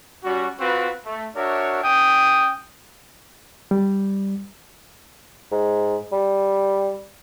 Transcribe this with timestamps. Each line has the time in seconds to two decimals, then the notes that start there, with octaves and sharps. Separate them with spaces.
0.25 G3 C#4 F#4
0.60 C4 F4 F#4 B4
1.06 A3
1.35 D4 F#4 A#4 C#5 E5
1.84 C#4 G5 D#6
3.71 G3
5.51 G#2
6.13 G3